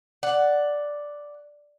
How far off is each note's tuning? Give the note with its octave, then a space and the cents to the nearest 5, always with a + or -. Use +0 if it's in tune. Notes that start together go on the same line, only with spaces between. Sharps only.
D5 +0 F#5 +5